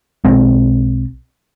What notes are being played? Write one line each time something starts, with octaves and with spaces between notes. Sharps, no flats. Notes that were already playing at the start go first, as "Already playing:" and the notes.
B1 G#3 C4